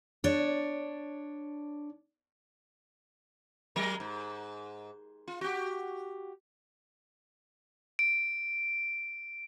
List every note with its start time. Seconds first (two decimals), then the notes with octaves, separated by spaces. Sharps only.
0.24 D4 C#5
3.76 F#3 G#3 A#4
4.00 G#2
5.28 F4
5.41 F#4 G4
7.99 D7